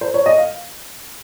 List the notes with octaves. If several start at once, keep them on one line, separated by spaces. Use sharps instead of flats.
C5
C#5
D#5
F5